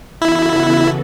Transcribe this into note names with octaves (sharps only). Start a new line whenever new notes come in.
C#3 E3 B3 E4 F#4 A4